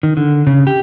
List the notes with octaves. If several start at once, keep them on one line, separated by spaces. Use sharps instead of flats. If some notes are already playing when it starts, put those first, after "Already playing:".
D#3
D3
C#3
G4